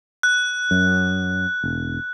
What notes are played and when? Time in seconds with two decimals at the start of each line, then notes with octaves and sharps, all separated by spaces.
0.23 F#6
0.71 F#2
1.63 E1